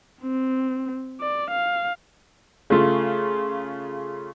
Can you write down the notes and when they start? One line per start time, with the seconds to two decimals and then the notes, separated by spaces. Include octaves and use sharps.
0.23 C4
1.20 D5
1.51 F5
2.70 C#3 A3 F4